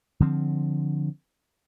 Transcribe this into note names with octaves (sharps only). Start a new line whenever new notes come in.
D3 F3 C4